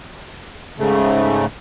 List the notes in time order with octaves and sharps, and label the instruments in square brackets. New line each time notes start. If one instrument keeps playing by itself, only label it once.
[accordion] G#2 C#3 A3